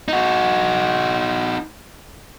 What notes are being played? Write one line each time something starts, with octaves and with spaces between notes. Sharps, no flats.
D#4 F#4